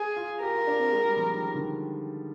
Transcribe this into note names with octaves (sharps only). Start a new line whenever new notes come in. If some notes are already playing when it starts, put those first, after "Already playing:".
Already playing: G#4
F4
G4 A#4
F4
D4
C4
G#3
G3
F3
D#3
D#3
D3